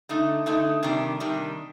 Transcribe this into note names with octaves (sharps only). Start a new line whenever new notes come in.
D3 A3 D#4
D3 A3 D#4
C3 D#3 G3 D4
C3 D#3 G3 D4